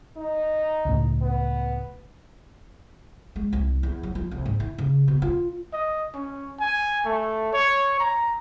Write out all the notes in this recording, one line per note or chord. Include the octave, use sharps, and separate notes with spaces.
D#4
C#2 A2
B3
G#3
C2
E2
F#3
F3
C2
G#2
E3
C#3
B2
F4
D#5
C#4
G#5
A3
C#5
A#5